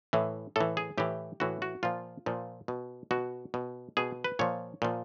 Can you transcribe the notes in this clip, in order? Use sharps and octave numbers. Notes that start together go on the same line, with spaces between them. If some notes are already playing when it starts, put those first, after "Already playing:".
A2 E3
A2 E3 A4
G#4
A2 E3 G4
A2 E3 F#4
F#4
A#2 F3 F4
A#2 F3
B2
B2 F#4
B2
B2 G#4
B4
A#2 F3 C#5
A#2 F3